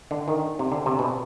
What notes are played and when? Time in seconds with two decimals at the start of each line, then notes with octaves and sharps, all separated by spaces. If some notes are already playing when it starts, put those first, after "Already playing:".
0.11 D3
0.28 D#3
0.59 C3
0.72 D3
0.86 C3
0.99 B2